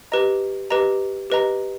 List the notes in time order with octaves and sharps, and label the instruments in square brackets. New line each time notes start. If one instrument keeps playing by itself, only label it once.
[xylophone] G4 B4 D#5 A#5
G4 B4 D#5 A#5
G4 B4 D#5 A#5